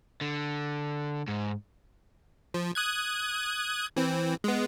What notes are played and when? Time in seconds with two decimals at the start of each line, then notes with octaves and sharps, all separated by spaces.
0.21 D3
1.28 G#2
2.54 F3
2.75 D#6 F#6 G#6
3.96 E3 C4
4.44 G#3 B3